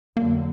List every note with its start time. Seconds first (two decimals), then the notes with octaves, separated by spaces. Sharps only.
0.16 F2 D3 F#3 A#3